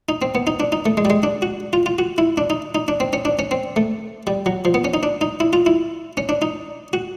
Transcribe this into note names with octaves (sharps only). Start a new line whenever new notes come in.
D#4
C4
B3
D#4
D4
D#4
A3
G#3
G3
G#3
D4
F#4
F4
F4
F#4
E4
D4
D#4
D#4
D4
C4
C#4
D4
C#4
C4
A3
G3
F#3
F3
B3
C#4
D#4
D4
D#4
E4
F4
E4
C#4
D4
D#4
F#4